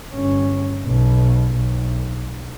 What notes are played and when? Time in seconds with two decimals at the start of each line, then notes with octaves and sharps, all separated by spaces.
0.14 G1 C#4
0.86 B1 B2
1.55 B1